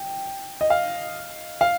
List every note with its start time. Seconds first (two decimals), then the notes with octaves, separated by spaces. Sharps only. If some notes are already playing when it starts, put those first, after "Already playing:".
Already playing: G5
0.61 D#5
0.70 F5
1.61 F5